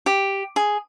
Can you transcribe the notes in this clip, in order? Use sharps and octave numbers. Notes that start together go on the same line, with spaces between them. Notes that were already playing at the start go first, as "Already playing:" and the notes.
G4
G#4